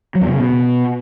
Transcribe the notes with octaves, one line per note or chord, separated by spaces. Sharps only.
F#3
E2
C3
C#3
B2